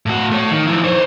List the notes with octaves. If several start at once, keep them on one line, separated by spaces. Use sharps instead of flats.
A2 F#4
A3 C#5
D#3
F3 E4
C5 C#5